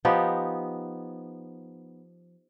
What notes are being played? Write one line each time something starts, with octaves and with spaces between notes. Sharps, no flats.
F3 B3 D#4 G4